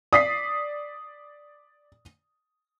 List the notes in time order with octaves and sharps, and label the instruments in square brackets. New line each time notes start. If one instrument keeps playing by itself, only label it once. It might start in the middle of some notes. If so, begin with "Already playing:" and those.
[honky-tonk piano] D5 [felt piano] D#6 B6 C7